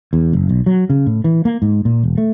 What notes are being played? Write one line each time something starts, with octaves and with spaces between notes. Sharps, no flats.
E2
F#1
B1
F#3
C#3
A2
E3
A#3
G#2
A#2
E1
A3